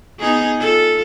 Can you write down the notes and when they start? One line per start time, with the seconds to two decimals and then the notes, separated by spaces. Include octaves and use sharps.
0.19 B3 D#4 G#4
0.59 F4 A4